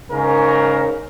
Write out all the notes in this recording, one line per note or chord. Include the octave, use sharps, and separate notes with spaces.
G#2 C#3 C#4 A#4